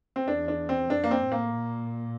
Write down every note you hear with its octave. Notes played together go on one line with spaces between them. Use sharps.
C4
E2 D4
D4
C4
F2 D4
A#3
C4
A2
A#3
A#2